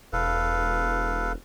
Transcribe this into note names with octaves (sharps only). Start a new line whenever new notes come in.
E1 A4 B4 F5